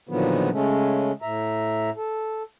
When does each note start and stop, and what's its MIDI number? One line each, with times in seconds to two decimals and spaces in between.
0.09 0.50 46
0.09 0.50 50
0.09 0.50 51
0.09 0.50 53
0.09 0.50 54
0.09 0.50 59
0.52 1.12 49
0.52 1.12 56
0.52 1.12 57
0.52 1.12 61
1.22 1.90 45
1.22 1.90 76
1.22 1.90 82
1.97 2.43 69